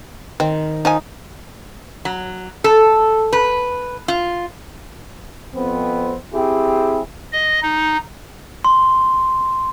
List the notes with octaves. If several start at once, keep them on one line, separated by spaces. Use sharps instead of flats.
D#3 C4
F3 D#4 G#5
F#3
A4
B4
F4
F2 B3 C4
C4 E4 G4 G#4
D#5
D#4
C6